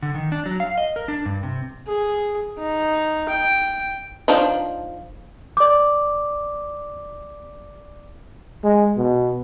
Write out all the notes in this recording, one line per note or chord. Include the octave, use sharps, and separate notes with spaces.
D3
D#3
D4
F#3
F5
D#5
A#4
D4
G2
C3
G#4
D#4
G5
F3 D4 D#4
D5 D6
G#3
B2